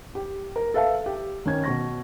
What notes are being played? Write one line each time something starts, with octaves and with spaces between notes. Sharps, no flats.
G4
A#4
A4 B4 E5 F5 A5
G4
D#3 C#4 G#6
B2 C#6 A#6